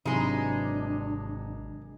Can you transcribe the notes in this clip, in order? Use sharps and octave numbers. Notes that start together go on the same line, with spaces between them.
G#1 C3 E3 F#3 G#3 D4 D#4